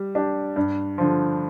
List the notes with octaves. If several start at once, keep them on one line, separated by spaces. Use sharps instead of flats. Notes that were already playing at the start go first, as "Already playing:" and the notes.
Already playing: G3
D4 G4
G2
D3 F3